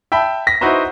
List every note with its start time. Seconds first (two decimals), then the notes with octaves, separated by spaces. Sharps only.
0.12 E5 G5 A5 B5
0.47 A#6 B6
0.61 D#4 E4 F#4 B4 C5 A#5